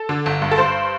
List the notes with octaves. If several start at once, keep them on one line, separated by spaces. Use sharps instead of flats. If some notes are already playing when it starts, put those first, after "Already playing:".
Already playing: A4
D3
G1
G2
A4
G2 C5